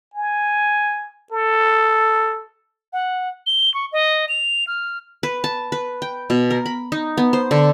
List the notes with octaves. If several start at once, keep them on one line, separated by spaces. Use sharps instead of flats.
G#5
A4
F#5
G7
C#6
D#5
F7
F6
B4
A5
B4
G5
B2
A#4
B5
D#4
B3
C5
D3